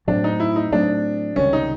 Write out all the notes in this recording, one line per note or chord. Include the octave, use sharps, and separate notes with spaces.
A2 F#3 A3 C4 D4
D#4
E4
D#4
A2 F#3 A3 C4 D4
C#2 C3 D#3 G3 C#4
D#4